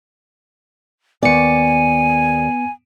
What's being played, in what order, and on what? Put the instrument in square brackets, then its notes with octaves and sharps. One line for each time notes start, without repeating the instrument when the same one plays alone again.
[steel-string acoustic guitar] D#2 D5 [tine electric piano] B3 C#7 [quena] G#5